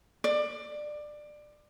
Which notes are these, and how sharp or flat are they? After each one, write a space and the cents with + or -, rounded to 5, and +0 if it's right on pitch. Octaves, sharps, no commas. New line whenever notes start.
D5 +20